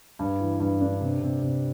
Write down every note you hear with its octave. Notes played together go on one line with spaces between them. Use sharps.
G2
E3
G2
D4
C3
C3
C3